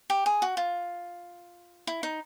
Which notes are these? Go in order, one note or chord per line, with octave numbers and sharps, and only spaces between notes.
G4
G#4
F#4
F4
E4
D#4